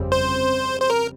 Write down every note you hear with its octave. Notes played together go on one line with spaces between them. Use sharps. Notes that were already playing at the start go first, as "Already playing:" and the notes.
Already playing: G1 F2 C#3 G3 C4
C5
C5
A#4